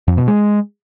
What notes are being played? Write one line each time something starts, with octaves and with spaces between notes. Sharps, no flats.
F2
B2
G#3